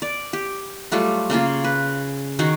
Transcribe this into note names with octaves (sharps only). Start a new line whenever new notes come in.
D5
G4
F#3 G3 A3 F4
C#3 A#3 C#4 F4
B4
D#3 D#4 F#4 G#4